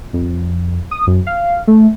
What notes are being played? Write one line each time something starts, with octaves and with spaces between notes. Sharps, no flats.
F2
D#6
F#2
F5
A3